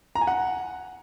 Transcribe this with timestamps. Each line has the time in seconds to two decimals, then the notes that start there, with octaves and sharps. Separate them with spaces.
0.15 A#5
0.21 G#5
0.27 F#5